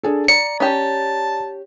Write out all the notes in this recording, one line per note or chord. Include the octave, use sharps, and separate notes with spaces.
D4 G#4 A4
D5 A#5 C#7
C#4 G4 A5